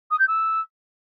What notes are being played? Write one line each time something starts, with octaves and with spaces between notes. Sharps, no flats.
D#6
G6
E6